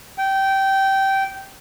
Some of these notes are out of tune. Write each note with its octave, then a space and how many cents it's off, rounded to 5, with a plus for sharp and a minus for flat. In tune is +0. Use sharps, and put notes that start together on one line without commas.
G5 -15